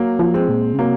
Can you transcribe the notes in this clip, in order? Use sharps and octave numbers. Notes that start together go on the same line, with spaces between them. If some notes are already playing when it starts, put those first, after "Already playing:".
Already playing: F#3 A#3
F3
G#3 C4
A#2
C#3
C3 F#3 A#3